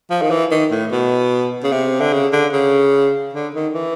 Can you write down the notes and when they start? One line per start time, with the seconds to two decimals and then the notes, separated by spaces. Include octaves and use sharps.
0.10 F3
0.22 D#3
0.31 E3
0.51 D#3
0.71 A2
0.91 B2
1.64 C#3
1.72 C3
2.00 D3
2.13 C#3
2.32 D3
2.53 C#3
3.34 D3
3.54 D#3
3.74 E3